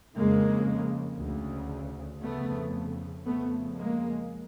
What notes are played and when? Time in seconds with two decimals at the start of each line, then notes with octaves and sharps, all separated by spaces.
0.15 F2 C#3 G#3 A#3
1.19 D2 C#3
2.22 F2 C#3 A3 B3
3.25 F2 C#3 A3 B3
3.77 G#3 A#3